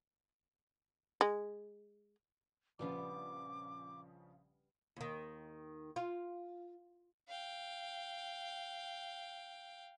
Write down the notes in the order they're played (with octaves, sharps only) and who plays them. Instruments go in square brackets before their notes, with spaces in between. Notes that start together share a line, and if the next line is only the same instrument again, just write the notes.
[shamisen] G#3
[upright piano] A#1 C#3 F3 [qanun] G3 B3 F4 [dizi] D6
[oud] D#2 D#3
F4
[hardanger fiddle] F5 G5